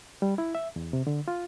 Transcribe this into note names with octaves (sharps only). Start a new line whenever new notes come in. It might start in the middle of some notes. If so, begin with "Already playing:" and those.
G3
E4
E5
E2
C3
D3
F4